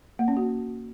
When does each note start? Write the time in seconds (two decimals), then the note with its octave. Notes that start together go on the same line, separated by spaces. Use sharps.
0.19 A#3
0.28 C#4
0.37 F#4